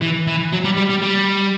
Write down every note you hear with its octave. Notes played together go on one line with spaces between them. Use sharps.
E3
E3
F#3
G3
G3
G3
G3